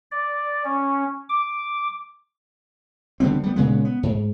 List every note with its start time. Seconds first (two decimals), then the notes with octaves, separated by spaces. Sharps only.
0.11 D5
0.65 C#4
1.29 D6
3.20 D3 G3 B3 C4
3.43 G3 B3
3.56 A#2 C#3 G#3 B3
3.85 B3
4.03 G#2